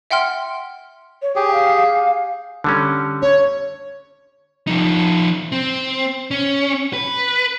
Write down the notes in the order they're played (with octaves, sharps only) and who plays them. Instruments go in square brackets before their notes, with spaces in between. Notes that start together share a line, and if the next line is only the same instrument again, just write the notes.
[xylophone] E5 F#5 G5 C6 F6
[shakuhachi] C#5
[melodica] G4 G#4 [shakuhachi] G5
[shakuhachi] F5
[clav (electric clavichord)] D3 G3 C#4
[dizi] C#5
[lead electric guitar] F3 D#4
C4
C#4
B4